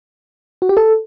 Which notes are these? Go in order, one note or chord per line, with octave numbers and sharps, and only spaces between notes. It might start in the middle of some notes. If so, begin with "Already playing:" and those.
F#4
G4
A4